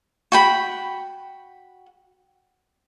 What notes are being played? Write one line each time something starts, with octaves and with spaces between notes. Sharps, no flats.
F#4 G5 B5